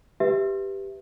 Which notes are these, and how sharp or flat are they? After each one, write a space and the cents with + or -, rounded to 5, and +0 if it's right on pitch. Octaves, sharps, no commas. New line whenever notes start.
G4 +0 B4 +0 E5 +0